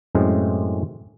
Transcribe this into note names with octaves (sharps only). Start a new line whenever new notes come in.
F#2 A2 G#3 C4